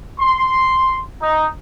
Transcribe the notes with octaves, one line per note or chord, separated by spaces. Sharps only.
C6
D#4